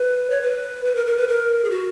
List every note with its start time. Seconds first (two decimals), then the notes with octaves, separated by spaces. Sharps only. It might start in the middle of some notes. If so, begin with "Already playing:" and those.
Already playing: B4
0.30 C#5
0.41 B4
0.85 B4
0.95 A#4
1.06 A#4
1.17 B4
1.28 A#4
1.64 G#4
1.70 F#4